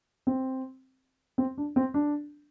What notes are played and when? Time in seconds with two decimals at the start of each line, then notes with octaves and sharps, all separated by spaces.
0.27 C4
1.38 C4
1.58 D4
1.76 C4
1.94 D4